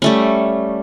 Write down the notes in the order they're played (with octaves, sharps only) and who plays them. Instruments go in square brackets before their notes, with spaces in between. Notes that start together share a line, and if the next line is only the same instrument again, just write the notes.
[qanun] G3 A3 C#4